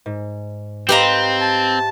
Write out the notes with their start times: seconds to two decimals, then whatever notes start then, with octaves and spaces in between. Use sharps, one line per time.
0.06 G#2
0.89 C4 G4 B4 C5 D#5 F5 A#5
1.41 A5